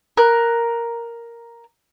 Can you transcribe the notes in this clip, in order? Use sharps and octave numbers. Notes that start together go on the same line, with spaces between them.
A#4 F#6